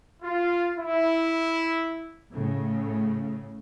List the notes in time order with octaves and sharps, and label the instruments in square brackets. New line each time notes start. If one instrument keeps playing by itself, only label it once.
[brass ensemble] F4
E4
[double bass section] A2 C#3